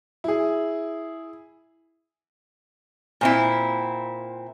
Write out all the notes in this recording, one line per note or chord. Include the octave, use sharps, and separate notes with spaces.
E4 G#4
A#2 C4 E4